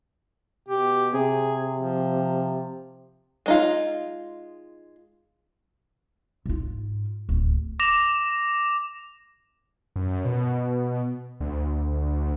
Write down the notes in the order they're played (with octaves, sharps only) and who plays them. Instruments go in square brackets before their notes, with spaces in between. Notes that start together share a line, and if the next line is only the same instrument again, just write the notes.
[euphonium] B2 [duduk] G4
[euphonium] C3 [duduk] G#4
[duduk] F3
[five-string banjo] G#3 D#4 F4
[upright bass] G#2 F4
D1
[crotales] D6 A#6 E7 F7
[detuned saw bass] F#2
B2
D2